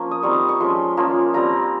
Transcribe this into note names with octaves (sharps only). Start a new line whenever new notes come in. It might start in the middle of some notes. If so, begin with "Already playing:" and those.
Already playing: F3 A#3 C#4 F4
D#6
G3 C4 D#4 C#6
C#6
F3 G#3 C#4 C6
F3 A#3 C#4 F4
G3 C4 F4 A#5